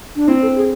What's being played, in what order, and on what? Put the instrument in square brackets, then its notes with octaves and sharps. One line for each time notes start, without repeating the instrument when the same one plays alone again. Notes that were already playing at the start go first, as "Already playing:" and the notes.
[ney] D4
[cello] C4 [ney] E4
[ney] A4
G#4